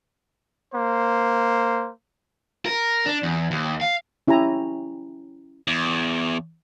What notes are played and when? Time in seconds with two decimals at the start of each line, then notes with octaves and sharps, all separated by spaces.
0.73 A#3 C5
2.66 A#4
3.06 D4
3.23 E2
3.51 D#2
3.81 F5
4.27 C#4 E4 G4 G#5 A#5
5.68 E2